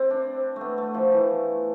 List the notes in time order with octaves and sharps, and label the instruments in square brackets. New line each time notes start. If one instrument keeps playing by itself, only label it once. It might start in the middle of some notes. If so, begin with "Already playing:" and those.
Already playing: [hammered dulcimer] C4 E4
D4
A3
B3
A3
F3
E3